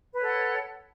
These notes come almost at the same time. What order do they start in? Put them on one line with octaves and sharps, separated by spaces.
B4 C#5 A4 F#5